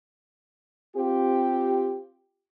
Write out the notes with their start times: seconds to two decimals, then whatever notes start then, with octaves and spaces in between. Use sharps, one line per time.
0.96 C4 F4 G4